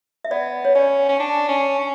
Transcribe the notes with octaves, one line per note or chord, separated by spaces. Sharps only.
E5
B3 D5
C#5
C#4 D5
C#4
D4
C#4
C#4